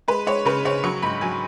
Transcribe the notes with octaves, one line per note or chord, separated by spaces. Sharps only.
G#3 B4
G#3 C#5
C#3 B4
C#3 C#5
F#3 C#6
G#2 B5
F#3 G#5